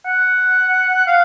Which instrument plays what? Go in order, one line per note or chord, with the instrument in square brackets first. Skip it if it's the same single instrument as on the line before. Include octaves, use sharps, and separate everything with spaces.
[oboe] F#5
F5